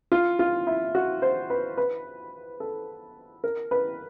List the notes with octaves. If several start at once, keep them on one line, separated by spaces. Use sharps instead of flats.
F4
F4
E4
F#4
C5
B4
B4
A4
A#4
B4